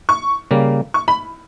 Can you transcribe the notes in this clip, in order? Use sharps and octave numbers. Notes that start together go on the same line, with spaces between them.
C#6
C#3 G3 A#3
C#6
B5